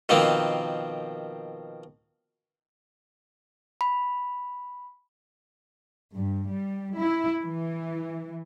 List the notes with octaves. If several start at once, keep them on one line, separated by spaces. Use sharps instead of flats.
B2 D#3 F3 A#3 C4
B5
G2
G3
E4
E3